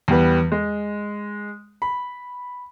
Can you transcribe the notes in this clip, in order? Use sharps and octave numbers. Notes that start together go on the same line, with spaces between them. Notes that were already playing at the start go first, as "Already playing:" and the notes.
E2 G3 B4
G#3
B5